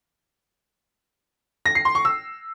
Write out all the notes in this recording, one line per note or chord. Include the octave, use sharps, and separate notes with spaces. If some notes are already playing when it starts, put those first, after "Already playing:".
A#6
C7
C6
C#6
E6